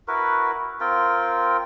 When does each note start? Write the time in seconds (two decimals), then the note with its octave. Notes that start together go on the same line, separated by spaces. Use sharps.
0.08 E4 F#4 A#4 B4
0.80 C4 F4 A#4 G5